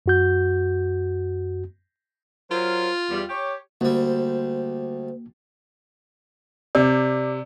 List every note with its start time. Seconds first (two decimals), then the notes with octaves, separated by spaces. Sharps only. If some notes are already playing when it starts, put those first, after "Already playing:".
0.06 F#2 F#4 G6
2.51 F#3 F4 A#4 C5
3.10 E2 G3
3.30 G4 C#5
3.81 D2 G3 A#3 C5
6.75 C3 D5